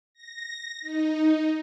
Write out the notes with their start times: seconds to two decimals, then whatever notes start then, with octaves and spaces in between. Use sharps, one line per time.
0.14 A#6
0.81 D#4